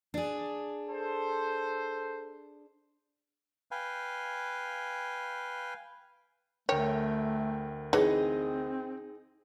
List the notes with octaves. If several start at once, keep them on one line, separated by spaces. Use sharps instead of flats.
D4 G#4
A4 C5
B4 F5 G5 G#5
D2 A3 A#4 C#5 G5
E3 C4 D#4 G#4 C#5 D#5